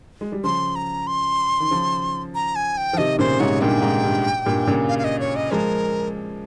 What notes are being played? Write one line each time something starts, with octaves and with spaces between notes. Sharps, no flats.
G#3
G3
C#3 F3 C6
A#5
C6
D#3
C#3 F3
A#5
G#5
G5
F3
C3 D#3 D#5
A#2 C#3 C5
G#2 C3 C#5
G2 A#2 G5
G#2
G2
G2 A#2
A#2 C#3
F5
F5
D#5
C#5
D#5
F3 G#3 A#4